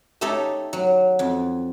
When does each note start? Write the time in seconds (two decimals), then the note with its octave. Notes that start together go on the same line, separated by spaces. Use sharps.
0.21 A3 D#4 G4 A4 C#5 D#5
0.73 F#3
1.19 F2